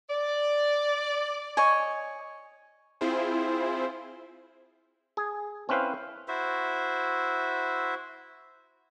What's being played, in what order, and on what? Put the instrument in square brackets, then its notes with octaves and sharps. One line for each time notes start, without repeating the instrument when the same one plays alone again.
[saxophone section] D5
[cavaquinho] C#5 D#5 G#5
[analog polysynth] C4 E4 F4 G#4 C5
[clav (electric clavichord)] G#4
C4 C#4 E4 B4 C5 F5
[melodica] E4 F#4 C5 E5